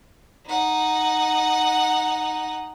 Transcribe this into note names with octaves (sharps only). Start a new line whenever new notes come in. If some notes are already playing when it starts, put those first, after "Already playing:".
D#4 F#5